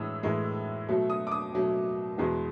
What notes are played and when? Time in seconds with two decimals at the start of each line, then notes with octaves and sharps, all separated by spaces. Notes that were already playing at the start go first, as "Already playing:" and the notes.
Already playing: A2 E3 G#3 D#6 E6
0.23 A2 E3 G#3
0.89 B2 F#3 A3
1.10 D#6
1.27 D6
1.31 D#6
1.53 B2 F#3 A3
2.18 E2 B2 G#3 B3